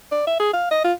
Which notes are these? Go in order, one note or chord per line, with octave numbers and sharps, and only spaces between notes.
D5
E5
G#4
F5
D#5
F4